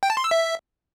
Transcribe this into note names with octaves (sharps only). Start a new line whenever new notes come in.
G5
A5
C6
E6
E5